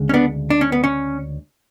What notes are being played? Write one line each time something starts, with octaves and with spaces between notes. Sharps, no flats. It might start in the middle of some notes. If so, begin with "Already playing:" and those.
Already playing: D2 C#3 G#3
C#4
B3 D4
D4
C#4
B3
C#4